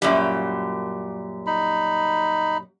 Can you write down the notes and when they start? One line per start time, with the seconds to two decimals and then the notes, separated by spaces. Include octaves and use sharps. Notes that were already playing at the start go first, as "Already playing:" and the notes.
0.02 F#2 A#2 G3
1.47 D#4 B5